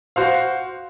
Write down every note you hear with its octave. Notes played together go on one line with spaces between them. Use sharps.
F#4 C5 F5